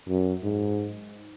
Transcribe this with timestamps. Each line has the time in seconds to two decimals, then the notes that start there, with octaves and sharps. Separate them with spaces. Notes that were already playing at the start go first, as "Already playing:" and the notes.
0.09 F#2
0.43 G#2